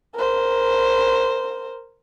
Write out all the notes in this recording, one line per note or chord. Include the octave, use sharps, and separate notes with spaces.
A#4 C5